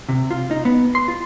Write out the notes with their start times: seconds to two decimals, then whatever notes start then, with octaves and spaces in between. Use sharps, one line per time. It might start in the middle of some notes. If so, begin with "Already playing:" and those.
0.09 C3
0.31 F4
0.51 D#4
0.65 B3
0.95 C6
1.08 F4